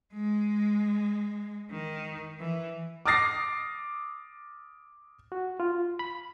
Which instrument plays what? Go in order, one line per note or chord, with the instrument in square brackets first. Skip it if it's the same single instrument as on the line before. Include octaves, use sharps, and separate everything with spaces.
[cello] G#3
D#3
E3
[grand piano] D6 D#6 F6 A6 A#6 C7
[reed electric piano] F#4
F4
B5